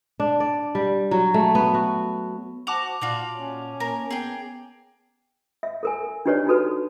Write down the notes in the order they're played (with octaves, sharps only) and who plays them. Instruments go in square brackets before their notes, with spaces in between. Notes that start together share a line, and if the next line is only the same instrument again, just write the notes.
[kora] D4
D5
G3
F#3
A3
B3
F#4
[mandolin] F#4 [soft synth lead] C5 [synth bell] A5 D6 F7
[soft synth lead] A#2 [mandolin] F4 F#4 D5
[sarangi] C#4
[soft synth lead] A#3 [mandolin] A#4
[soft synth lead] B3 [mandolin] G#4 G5
[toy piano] E5
A4 A#4 G#5
D4 D#4 G4 B4 C#5 D5
D#4 F#4 A4 B4